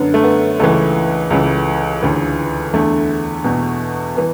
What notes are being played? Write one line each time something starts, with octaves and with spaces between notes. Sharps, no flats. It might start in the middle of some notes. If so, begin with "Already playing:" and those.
Already playing: F#2 D3 B3
A3
B3
C#2 C#3 E3 A3
C#2 C#3 E3
D2 C#3 E3
E2 D3 A3
E2 B2
E3 B3